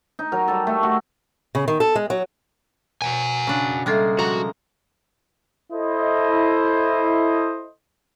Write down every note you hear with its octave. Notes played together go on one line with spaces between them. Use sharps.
D#4
F#3 A#4
G3 A4
A3
F#4
C#3
D#3
A4
G#3
F#3
B2 F#4 F#5 G#5
C#3 D4
G3 G#3 A#3 A4 E5
F3 F#4 A#5
E4 A4 C5 D#5